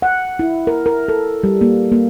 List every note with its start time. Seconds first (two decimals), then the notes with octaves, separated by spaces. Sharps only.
0.02 F#5
0.39 E4
0.67 A#4
0.86 A#4
1.08 A4
1.44 G3
1.61 A#3
1.92 A#3